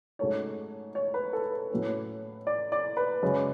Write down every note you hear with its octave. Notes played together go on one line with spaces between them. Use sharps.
G#2 F#3 A3 C#4 C#5
C#5
B4
A4
B4
A2 F#3 A3 C#4
D5
D5
B4
F#2 C#3 G#3 C#4